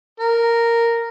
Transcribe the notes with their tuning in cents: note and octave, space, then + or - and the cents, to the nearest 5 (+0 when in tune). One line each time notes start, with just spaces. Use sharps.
A#4 -5